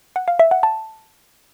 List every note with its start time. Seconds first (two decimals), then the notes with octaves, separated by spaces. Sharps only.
0.16 F#5
0.28 F5
0.39 E5
0.51 F#5
0.63 A5